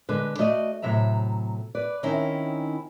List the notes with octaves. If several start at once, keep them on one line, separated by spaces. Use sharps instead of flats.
D3 G#3 B4
A3 F#4 D5 D#5
A2 C3 F#3 E5 A#5
B4 D5
D#3 C4 C#4 D#4 E4